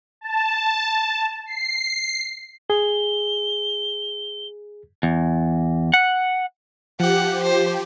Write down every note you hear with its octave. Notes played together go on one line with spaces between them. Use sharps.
A5
C7
G#4 G7
E2
F#5
F3 G4 F#5
C5